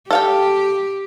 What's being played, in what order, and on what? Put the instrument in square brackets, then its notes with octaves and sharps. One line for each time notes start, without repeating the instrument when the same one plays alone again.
[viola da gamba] G4 [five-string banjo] A4 F5 G5